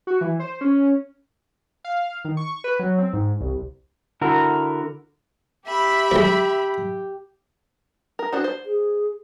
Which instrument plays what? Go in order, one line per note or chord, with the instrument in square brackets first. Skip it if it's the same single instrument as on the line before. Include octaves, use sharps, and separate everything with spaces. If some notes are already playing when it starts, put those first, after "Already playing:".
[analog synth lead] F#4
E3
C5
C#4
[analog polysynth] F5
D#3
C#6
B4
F#3
C4
G#2
C2
[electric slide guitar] D3 E4 F#4 A#4
[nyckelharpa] G4 [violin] E5 B5
[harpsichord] D2 G#3
[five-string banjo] A#4
D4 F#4 C5
C5
[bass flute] G#4